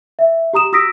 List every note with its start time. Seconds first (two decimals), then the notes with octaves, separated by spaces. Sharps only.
0.19 E5
0.53 G4 A#5 D#6 E7
0.73 F#4 D#6 E6 A#6 B6 D7